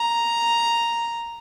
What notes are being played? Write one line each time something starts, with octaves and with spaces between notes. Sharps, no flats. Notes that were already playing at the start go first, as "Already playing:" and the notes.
Already playing: A#5